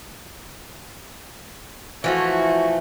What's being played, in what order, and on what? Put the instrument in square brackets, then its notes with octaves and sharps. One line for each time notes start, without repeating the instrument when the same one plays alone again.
[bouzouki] E3 F3 A3 [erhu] F#4